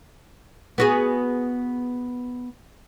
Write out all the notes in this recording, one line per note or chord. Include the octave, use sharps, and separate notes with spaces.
B3 F#4 G#4